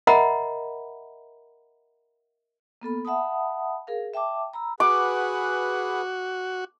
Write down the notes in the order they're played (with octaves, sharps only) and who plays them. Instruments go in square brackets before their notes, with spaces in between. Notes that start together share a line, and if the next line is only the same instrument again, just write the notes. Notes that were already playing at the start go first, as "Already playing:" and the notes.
[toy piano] A#4 D#5 E5 F#5 A#5 B5
[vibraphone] A#3 B3 A4 B5
E5 F#5 A5 B5 D#6
G#4 A#4 F5
E5 G5 A5 D6
A#5 B5 E6
[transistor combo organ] F#4 [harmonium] G#4 B4 F#5 [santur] D6